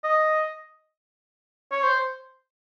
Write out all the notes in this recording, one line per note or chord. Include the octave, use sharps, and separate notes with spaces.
D#5
C#5
C5